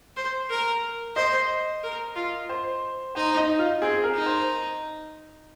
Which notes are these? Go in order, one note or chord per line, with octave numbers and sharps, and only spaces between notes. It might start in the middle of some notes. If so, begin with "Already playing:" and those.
C5
A#4
C5 D#5
A#4
F4
C5
D#4 C5
D#4
F4
C4 G#4
A#4
D#4
C5